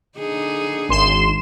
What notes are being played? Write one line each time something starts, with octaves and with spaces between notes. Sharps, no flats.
D3 D#4 G#4
G#1 C6 E7